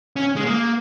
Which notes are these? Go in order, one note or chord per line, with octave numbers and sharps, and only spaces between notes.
C#4
G#3
A#3